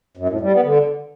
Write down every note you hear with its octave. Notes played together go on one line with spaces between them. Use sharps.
F#2
A2
G3
B3
D3